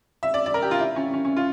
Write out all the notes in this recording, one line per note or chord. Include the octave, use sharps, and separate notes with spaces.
E5
D5
D5
A#4
G4
F4
E4
C#4
C#4
C#4
F4